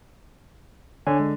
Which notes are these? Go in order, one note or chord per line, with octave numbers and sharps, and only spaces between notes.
D3 C#5 G#5
G#3